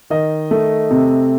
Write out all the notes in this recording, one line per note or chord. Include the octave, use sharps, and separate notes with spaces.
D#3 D#5
A3
C3